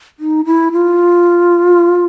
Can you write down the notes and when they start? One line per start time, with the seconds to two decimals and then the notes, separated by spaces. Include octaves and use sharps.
0.20 D#4
0.45 E4
0.72 F4